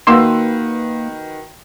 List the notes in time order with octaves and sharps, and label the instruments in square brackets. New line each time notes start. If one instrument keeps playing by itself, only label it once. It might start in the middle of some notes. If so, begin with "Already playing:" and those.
[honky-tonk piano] D#3 F#4 B4 [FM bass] A#3 [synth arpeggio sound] C6 E6